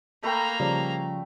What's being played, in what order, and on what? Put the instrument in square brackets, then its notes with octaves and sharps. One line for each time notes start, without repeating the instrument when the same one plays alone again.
[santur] A3 B4 G5 [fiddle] A#3 A#5
[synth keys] C#3 F3 G3